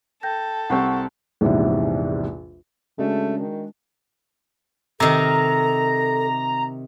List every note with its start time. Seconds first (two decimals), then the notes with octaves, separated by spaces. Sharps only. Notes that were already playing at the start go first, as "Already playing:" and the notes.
0.23 A4 G5 G6 A#6
0.70 C2 C4 F#5 C#6
1.41 A#1 E2 G#2 C3
2.99 C#3 G#3 A3 D4 F#4
3.38 D#3
5.00 C3 D#3 A4 A#5